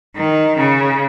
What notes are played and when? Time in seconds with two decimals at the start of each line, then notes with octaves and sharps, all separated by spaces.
0.17 D#3
0.57 C#3